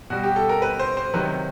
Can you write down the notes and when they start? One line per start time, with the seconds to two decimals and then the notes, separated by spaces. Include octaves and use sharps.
0.10 B2 G3 F#4
0.23 G4
0.36 A4
0.49 A#4
0.62 B4
0.80 C5
0.97 C5
1.14 C3 D#3 F#3 B4